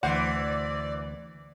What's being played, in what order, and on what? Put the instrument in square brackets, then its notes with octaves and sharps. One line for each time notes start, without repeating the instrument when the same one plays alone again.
[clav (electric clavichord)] D2 E5 [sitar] E3 C5 [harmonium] D5 [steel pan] F#5